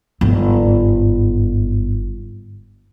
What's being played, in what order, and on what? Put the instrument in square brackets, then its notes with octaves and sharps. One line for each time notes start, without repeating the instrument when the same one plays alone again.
[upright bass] G1 G#2